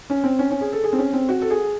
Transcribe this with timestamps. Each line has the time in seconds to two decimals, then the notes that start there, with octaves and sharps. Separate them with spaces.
0.10 C#4
0.24 C4
0.39 C#4
0.51 C#4
0.61 G#4
0.73 A4
0.84 G#4
0.93 C4
0.98 C#4
1.13 C4
1.29 F#4
1.42 A4
1.50 G#4